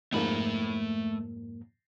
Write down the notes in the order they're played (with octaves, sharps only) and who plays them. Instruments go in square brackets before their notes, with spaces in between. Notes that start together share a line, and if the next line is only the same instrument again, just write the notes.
[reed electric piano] F2 G#2 A#3 [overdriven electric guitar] A3 B5